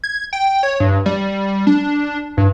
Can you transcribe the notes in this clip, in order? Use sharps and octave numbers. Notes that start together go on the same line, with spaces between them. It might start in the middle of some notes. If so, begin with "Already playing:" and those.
G#6
G5
C#5
G2
G3
D4
G2